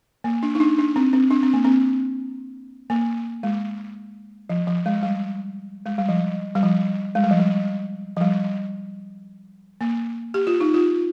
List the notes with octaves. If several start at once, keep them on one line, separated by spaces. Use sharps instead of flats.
A#3
D4
D#4
D4
D4
C4
C4
D4
C4
A#3
C4
A#3
G#3
F3
F3
G#3
G3
G#3
G3
F3
G3
F3
G#3
G3
F3
G3
F3
G3
A#3
G4
F4
D#4
F4